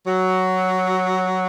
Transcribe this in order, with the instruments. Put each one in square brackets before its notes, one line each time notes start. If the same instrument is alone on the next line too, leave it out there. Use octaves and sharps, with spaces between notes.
[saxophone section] F#3